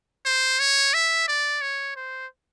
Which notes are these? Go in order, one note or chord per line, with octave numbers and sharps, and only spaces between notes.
C5
C#5
E5
D5
C#5
C5